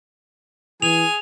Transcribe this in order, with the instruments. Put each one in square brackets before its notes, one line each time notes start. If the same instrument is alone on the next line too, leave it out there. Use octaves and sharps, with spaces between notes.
[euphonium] E3 [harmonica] G#4 G#5 [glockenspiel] F7